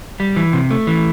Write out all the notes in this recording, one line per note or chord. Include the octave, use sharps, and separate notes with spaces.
G3
E3
C3
A3
E3